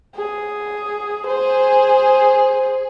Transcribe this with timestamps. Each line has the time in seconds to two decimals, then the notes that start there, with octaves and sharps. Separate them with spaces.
0.16 G#4
1.27 G#4 C5